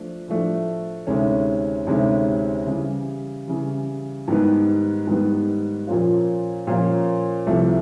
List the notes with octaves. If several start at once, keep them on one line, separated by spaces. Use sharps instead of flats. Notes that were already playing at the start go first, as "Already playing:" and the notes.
Already playing: F3 A3 D4
A2 F3 A3 D4
D2 C3 D#3 G#3 C#4
D2 C3 D#3 G#3 C#4
C#3 E3 G3
C#3 E3 G3
G#2 D#3 G3 B3
G#2 D#3 G3 B3
A#2 F3 A#3 C#4 F4
A#2 F3 A#3 C#4 F4
C2 C3 F3 A3